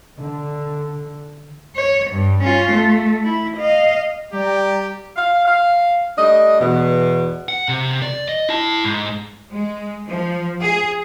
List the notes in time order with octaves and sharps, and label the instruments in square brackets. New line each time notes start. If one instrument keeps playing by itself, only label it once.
[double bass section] D3
[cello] C#5
G2
C#4 F4
A3
E4
D#5 F5
[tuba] G3 [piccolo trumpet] G4 [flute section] D5 G5 A#5
[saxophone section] F5
F5
G3 A3 D4 D#5
E2 B2
[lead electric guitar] F#5
C3
D5
D#5
E4 A5
G#2
[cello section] G#3
F3
G#4